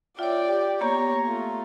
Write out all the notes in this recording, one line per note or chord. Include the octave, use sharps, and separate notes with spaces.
F4 C#5 D5 E5 G5
G4
A#3 B3 G4 C#5 A#5
A3 F4